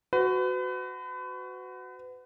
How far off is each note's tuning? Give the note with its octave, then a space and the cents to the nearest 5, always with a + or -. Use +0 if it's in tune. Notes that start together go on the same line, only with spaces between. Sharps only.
F#4 +0 B4 +35